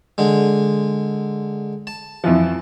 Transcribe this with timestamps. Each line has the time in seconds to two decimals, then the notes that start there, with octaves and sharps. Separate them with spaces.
0.18 D3 G#3
1.87 A5
2.24 F2 E3 F3